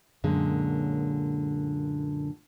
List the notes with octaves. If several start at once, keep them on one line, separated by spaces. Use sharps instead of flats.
F#2 A#2 D3 G#3 C#4